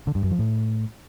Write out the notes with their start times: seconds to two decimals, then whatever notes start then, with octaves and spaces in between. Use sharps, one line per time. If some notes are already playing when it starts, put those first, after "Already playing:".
0.07 D3
0.15 G2
0.23 F#2
0.31 F3
0.39 A2